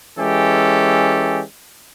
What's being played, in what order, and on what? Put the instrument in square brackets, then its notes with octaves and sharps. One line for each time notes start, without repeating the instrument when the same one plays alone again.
[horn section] E3 G#3 C#4 G4 A4